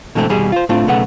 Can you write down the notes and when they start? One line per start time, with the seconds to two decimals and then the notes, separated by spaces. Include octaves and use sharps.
0.15 B2 D3 E3 G#3 A3 C4
0.29 D#2 B2 G3 G#4
0.52 F4 C5
0.69 A2 A3 C4 D4 F4
0.87 B1 C#3 A3 B3 F#5